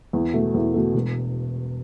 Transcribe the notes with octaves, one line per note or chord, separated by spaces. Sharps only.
E2
B2 A3
E2
B2 A3
E1